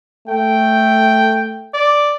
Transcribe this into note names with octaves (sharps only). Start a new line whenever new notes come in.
A3 G5
D5